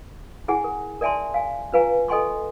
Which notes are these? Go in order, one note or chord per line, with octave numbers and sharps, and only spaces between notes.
E4 G#4 F#5 G#5
A#4
A#4 D5 E5 G#5 A5 C6
F5 G#5
C#4 F4 B4 F5 G#5 A#5
A4 D#5 G5 G#5 C6 C#6